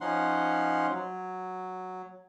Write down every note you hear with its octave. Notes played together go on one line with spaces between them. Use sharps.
F3 C#4 D#4 F#5 C6
F#3